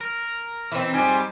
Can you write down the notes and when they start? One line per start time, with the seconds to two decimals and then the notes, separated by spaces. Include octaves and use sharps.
0.01 A#4
0.72 E3 C4 D#4 E4
0.94 G#2 F3 G3 G#3 D#4 C5 G#5 C6